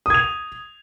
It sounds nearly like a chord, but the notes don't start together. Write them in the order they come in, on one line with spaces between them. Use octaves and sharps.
D#6 G#6 F7